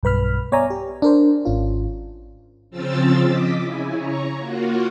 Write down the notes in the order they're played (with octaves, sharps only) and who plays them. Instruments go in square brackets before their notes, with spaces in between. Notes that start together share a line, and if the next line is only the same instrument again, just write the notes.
[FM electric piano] B1 G2 B4 B5 F6
B3 C#5 D5 E5 G#5 A#5
G4
D4 A#4 C5
G#1 C#4 F4
[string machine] C#3 F3 C4 F4 E6 A6
D#5 D6 B6
C#3 E4 G#5
C#5 A#5 C#6
A#3 F4 F#4